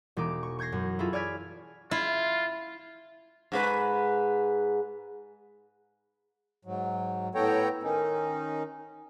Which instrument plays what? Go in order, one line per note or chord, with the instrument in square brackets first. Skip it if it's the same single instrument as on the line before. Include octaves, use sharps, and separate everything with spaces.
[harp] E1 D#4 D6
C#6
C#6 G6 G#6 A#6 C7
F#2
E4 F4 G#4 A4
C#5 D5 G#5 F6 G#6 B6
[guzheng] E4 [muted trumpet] F4
[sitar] G#2 G#3 B4
[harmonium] G#2 F#3
A2 B3 A4 C#5 G5 A#5
D#3 C#4 D#4